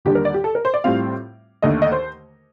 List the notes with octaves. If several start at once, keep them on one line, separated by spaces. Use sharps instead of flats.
D#2 D3 G3 D4 G4
A#4
D5
G4
A4
A#4
C5
D5
A2 G3 C4 F4 F5
D#2 D3 A3 D#5
D#5
C5